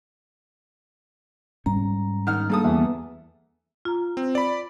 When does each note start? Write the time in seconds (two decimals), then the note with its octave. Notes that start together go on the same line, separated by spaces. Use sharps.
1.66 G#2 G3 C#4 A#5
2.27 D#3 F#5 F6
2.50 G2 A#3 A4 D#6
2.64 E2 E5
3.85 F4 A#5
4.17 C4
4.35 D5 B5